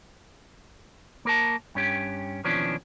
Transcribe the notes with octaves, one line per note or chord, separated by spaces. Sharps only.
A#3 A#4 A5
G2 C#4 G4
D#2 B2 E3 F3 C#4 D4